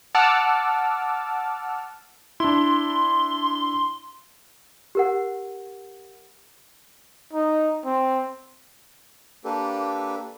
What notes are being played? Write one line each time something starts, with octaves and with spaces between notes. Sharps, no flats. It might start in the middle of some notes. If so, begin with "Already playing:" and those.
F#5 A5 D6 E6 F6
D4 E4 C6
G4 A#4 F#5
D#4
C4
A#3 D4 G4 A4 B4